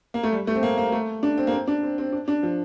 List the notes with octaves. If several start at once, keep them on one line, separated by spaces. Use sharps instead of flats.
A#3
A3
G3
A3
C4
A#3
A#3
A3
D4
C4
A#3
C4
D4
C4
C4
D4
D4
F3